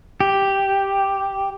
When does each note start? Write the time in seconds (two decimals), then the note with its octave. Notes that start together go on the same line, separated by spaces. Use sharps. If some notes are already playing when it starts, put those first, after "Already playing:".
0.20 G4